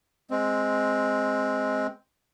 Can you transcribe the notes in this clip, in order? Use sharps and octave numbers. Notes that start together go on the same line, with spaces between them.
G#3 C4